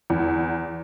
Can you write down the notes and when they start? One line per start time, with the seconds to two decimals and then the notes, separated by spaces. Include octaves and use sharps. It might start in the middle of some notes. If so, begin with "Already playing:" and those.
0.10 E2